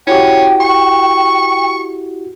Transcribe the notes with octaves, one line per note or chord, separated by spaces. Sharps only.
C#4 E4 F#4 G4 G5
C#6